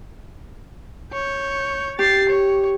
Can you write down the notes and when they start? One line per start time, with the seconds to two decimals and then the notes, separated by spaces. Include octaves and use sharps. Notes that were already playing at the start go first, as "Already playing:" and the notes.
1.13 C#5 G6
1.99 G4 A6 C7
2.30 C#5